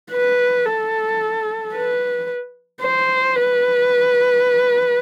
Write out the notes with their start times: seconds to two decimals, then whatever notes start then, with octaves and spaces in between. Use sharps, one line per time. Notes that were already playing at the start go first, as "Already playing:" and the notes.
0.12 B4
0.66 A4
1.74 B4
2.82 C5
3.37 B4